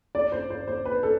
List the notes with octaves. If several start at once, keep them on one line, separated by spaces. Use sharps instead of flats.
D5
C5
C5
C5
B4
A4